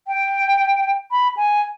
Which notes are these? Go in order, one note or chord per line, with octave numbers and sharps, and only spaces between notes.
G5
B5
G#5